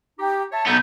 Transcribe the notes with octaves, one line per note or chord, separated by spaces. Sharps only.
D#4 G4
C#5 E5 A5
B1 B3 A4 A#5 G6